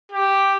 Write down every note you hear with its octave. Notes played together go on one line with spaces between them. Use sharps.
G4